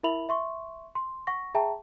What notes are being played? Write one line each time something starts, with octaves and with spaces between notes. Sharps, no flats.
E4 A#4 E5 B5 F7 F#7
E5 C6 C#6
C6
F#5 C#6 A#6
G#4 E5 G5 A5 A#5